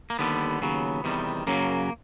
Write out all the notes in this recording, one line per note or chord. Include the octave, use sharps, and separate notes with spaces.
A#3
D#2 D3 G3 B3
D#2 C#3 F#3
E2 C3 D#3 G3
F#2 C#3 F#3 A#3